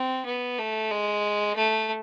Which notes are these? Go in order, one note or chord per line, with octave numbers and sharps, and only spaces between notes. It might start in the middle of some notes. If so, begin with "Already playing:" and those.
Already playing: C4
B3
A3
G#3
A3